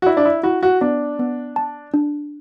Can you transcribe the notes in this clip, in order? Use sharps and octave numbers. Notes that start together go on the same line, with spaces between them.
F#4
E4 D5
D4
E4
E4 F#4
F#4
B3 D4
B3
A5
D4